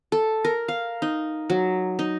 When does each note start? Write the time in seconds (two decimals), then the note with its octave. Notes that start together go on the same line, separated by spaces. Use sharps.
0.12 A4
0.44 A#4
0.68 F5
1.02 D#4
1.50 F#3
1.99 D#4